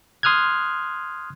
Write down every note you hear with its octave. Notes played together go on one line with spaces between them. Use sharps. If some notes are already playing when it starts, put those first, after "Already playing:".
C6 D#6 F6 F#6 G#6